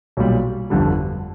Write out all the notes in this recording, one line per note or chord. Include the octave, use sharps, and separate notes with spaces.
B1 A#2 G3
G1 F2 D3 G3